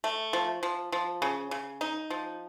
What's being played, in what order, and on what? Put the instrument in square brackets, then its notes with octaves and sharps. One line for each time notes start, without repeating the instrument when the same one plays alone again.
[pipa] A3
F3
F3
F3
C#3
C#3
D#4
F3